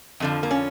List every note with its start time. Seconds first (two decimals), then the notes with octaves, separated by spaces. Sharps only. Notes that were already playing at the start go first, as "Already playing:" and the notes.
0.20 F2 D3 F3
0.43 A#3
0.51 C#4